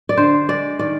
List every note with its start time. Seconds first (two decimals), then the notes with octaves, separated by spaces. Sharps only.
0.09 D5
0.17 D3 C5
0.48 G#3 D5
0.79 D#3 D5